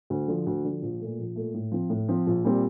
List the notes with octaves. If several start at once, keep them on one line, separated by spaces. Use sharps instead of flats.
D2
D3 F3
D2
D3 F3
A#1
A#2 A3
A#1
A#2 A3
A2
F3 C4
A2
F3 C4
A#1
A#2 G3 C4